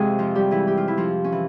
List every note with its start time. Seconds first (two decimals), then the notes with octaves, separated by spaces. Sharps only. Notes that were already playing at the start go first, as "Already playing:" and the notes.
Already playing: F2 C3 G#3 G#4
0.19 F3 F4
0.35 G3 G4
0.51 E3 E4
0.67 G4
0.77 F4
0.88 E4
0.97 F3 F4
1.24 C#4
1.32 E3